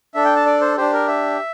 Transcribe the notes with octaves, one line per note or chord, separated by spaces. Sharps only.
D4 A4 E5
G5
A5
D5
C5
D4 G4 C5
A#4
E5